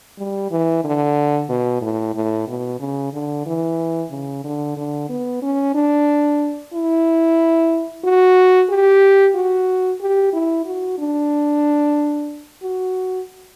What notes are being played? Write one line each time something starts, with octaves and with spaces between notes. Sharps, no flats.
G3
E3
D3
B2
A2
A2
B2
C#3
D3
E3
C#3
D3
D3
B3
C#4
D4
E4
F#4
G4
F#4
G4
E4
F#4
D4
F#4